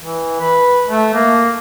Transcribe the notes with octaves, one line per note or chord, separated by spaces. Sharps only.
E3
B4
A3
A#3